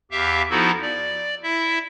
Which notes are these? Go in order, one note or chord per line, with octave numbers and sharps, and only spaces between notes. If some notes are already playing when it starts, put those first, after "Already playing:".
E2 G4 E5 F5
F3 B3 D#4 E4 F#4 A4
D5
E4 E5